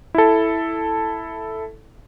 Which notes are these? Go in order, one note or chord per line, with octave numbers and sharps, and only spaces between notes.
E4 A4